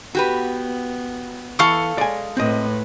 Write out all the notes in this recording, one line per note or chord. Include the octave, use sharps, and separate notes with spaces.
B3 F#4 G4 B4
E3 A4 F5 C#6
G#3 D5 G#5
A2 C4 B4 D#5